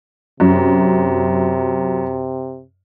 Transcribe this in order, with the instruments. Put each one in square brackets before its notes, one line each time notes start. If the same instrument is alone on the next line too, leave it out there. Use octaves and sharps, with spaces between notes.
[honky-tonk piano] F#2 [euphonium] C3